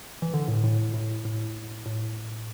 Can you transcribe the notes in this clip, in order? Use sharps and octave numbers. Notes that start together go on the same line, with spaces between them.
E3
D3
A2
A2
A2
A2
A2